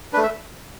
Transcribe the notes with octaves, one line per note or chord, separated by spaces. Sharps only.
A3 D4 B4
E5